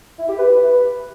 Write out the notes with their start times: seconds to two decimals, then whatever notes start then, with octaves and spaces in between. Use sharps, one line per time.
0.19 E4
0.29 G4
0.39 B4